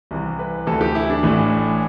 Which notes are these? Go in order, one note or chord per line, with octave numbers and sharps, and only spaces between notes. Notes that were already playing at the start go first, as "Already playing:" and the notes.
C2 C3 E3
B4
D2 C3 E3 A4
G4
E4
D4
A1 A2 E3